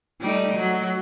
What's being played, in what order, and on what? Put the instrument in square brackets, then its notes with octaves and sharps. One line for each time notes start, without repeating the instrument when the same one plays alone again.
[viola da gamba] G3 A3 D#4
F#3